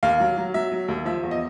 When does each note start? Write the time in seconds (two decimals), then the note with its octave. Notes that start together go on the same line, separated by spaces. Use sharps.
0.03 D#2 F5
0.20 F#3
0.37 F#3
0.54 F#3 E5
0.72 F#3
0.88 D#2
1.05 F3 E5
1.23 E2
1.31 D#5